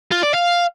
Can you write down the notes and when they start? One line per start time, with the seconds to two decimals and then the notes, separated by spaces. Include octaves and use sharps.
0.11 F4
0.23 D5
0.34 F5